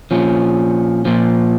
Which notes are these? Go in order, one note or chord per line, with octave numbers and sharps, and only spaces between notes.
A#2 F3 C#4
A#2 F3